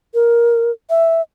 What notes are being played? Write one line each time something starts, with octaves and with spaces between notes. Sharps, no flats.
A#4
E5